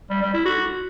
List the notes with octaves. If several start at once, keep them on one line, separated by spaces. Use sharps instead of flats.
G3
G3
E4
F#4